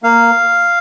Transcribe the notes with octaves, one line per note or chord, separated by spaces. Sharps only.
A#3 F5